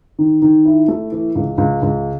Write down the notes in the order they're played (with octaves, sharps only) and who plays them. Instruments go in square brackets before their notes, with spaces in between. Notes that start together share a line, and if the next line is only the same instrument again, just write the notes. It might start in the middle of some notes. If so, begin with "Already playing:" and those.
[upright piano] D#3
D#3
E4
A3
E3
C#2
C#2
C#2